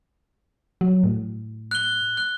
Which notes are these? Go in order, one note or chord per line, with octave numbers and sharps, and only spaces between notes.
F#3
A2
F#6 G7
F#6